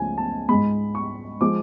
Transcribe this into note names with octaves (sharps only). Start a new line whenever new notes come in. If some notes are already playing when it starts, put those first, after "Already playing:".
Already playing: C#2 C#3 F3 A3 G#5
A5
G#2 G#3 B5
C#6
F3 G#3 D6